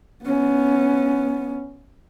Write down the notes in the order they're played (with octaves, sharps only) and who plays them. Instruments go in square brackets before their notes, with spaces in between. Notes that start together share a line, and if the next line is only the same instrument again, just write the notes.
[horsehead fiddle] B3 C#4